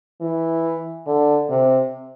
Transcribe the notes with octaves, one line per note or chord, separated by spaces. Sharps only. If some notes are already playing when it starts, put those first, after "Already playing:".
E3
D3
C3